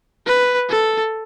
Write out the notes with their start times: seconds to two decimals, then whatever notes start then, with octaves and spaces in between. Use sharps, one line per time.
0.26 B4
0.70 A4